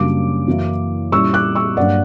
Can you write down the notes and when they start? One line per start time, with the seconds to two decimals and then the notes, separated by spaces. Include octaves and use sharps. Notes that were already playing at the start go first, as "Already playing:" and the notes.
Already playing: F#2 C#3 G3 A#3 D4 D6
0.47 F#2 E3 A#3 E4
1.12 A#2 G3 C#4 E4 C#6 E6
1.34 D6 F#6
1.55 C#6 E6
1.77 G2 F#3 A#3 D4 D5 F#5